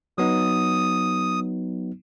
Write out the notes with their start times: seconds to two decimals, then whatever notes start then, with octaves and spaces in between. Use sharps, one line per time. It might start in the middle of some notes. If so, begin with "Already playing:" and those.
0.18 F#3 B3 D#4 D#6